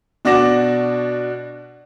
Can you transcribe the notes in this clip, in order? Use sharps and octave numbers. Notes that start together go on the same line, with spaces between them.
B2 D4 F#4 D6 A#6 E7